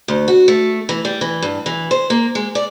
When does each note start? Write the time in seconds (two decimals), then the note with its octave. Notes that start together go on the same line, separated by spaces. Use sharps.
0.08 D2
0.28 F#4
0.48 A3
0.89 E3
1.05 G3
1.21 E3
1.42 G2
1.66 E3
1.91 C5
2.10 A#3
2.35 G#3
2.55 D5